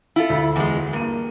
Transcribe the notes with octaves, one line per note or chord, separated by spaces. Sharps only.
E4 F4 A4
D2
E2 G#3
G2 A#3 D#7